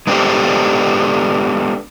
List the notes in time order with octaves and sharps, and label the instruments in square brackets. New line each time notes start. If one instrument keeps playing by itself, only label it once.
[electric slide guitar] G#3 B3 D4 G4 A4 C5